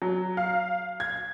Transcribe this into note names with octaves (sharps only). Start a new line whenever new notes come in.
F#3
F5
G#6